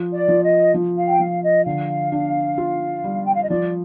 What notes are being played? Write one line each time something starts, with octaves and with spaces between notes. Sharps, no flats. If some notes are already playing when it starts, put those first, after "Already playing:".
Already playing: F3
D5
F3
D#5
F3
F5
G5
F3 F5
D#5
D3 F5
D4
F4
G3
G5
F5
D#5
F3 D5